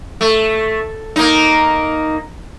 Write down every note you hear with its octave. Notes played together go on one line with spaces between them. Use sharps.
A3
A#3 D#4